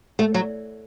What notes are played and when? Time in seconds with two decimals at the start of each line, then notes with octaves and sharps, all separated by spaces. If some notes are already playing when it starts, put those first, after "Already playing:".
0.19 A3
0.34 F#3